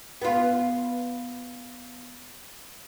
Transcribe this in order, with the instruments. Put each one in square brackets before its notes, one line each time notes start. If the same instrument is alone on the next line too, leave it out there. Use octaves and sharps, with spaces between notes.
[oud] B3 F4